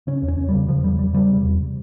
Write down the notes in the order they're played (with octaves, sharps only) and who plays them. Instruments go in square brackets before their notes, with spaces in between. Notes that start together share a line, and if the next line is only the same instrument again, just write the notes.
[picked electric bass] C#3 C#4
E2
C#4
E2
G3
C#3
C#3 F3
E2 G3
E2 G3
C#3 G3
C3
E2